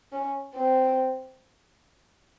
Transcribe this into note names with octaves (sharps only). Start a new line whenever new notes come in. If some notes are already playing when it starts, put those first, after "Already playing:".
C#4
C4